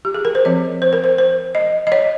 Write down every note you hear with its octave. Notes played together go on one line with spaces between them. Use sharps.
G4
G#4
A#4
C5
F3 C4 C#5
C5
A#4
C5
C5
D#5
D#5
C#5